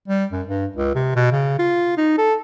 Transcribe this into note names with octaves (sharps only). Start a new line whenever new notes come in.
G3
F#2
G2
C#2
C3
B2
C#3
F4
D#4
A4